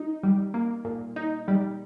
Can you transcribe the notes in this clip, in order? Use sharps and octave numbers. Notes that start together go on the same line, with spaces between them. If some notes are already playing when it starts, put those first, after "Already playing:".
Already playing: D#4
G3
A#3
A#2
D#4
G3